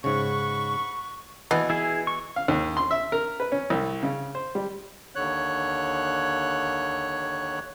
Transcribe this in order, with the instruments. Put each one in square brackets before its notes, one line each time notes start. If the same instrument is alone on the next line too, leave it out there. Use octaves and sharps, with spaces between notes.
[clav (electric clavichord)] G#2 C#3 [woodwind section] F#5 B5 C#6
[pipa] B2 [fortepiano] E3
[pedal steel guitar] E4 G#4
C#6
[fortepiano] F5
D#2
C6
E5
A#4
B4
C#4
C2
C#3
C5
G3
[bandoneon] D#2 D3 C#5 F#6